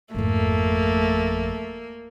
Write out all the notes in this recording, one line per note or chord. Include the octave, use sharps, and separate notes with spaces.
G#1 F2 A3 A#3